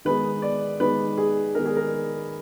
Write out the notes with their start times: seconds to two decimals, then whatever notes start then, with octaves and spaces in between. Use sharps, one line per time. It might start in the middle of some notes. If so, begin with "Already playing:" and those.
0.05 D#3 G#3 B3 D#4 B4
0.42 D5
0.80 D#3 G#3 B3 D#4 B4
1.18 G#4
1.55 D#3 G#3 B3 D#4 A#4
1.66 G#4
1.77 A#4